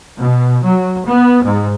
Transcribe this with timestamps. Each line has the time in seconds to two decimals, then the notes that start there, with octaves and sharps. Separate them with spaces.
0.18 B2
0.64 F#3
1.05 B3
1.43 G#2